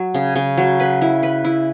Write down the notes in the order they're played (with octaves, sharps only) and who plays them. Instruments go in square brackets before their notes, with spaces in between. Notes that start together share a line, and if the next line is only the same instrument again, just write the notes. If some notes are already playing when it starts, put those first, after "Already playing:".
Already playing: [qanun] F#3
C#3
C#3
F#3
B4
E4
B4
E4